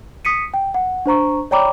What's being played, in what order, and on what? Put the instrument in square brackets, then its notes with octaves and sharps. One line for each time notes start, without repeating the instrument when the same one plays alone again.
[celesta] D#6 B6 C#7 D#7
G5
F#5
D4 C5 A#5 C#6
C#5 D5 G5 A#5 B5 D6